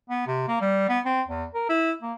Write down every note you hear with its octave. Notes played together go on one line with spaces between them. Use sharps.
B3
C3
A#3
G3
B3
C4
E2
A#4
E4
A#3